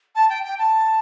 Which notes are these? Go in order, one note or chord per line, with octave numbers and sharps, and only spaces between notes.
A5
G5
G5
A5